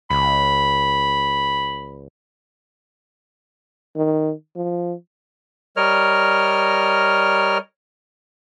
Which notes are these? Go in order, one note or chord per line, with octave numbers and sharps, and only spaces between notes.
C#2 B5
D#3
F3
G3 A#4 C#5 D#5 F6